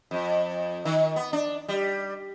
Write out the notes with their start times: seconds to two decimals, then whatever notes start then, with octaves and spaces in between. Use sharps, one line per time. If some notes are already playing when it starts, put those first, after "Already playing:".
0.11 F2
0.85 D#3
1.16 B3
1.33 D4
1.68 G3